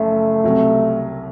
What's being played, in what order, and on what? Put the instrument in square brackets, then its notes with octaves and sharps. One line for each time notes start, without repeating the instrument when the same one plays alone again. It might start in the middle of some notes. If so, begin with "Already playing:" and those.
Already playing: [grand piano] F#1 F#2 F3 [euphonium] A3
[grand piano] C2 C3 F#3